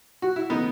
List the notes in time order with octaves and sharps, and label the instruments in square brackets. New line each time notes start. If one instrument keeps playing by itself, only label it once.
[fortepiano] F#4
E4
[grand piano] C#3 E3 A3 [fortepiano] B3 D#4